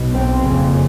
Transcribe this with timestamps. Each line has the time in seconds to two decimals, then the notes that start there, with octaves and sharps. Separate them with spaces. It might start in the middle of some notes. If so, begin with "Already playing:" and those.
Already playing: B1 B2
0.12 C4
0.42 F#1 F2 C#3